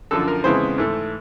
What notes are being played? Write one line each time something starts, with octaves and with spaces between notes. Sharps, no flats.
F#2 D3 F3 A4
A#4
F2 C#3 E3 G#3 B3 C5
G#2 E3 A3